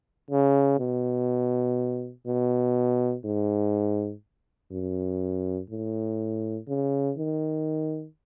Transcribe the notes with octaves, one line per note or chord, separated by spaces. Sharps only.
C#3
B2
B2
G#2
F#2
A2
C#3
D#3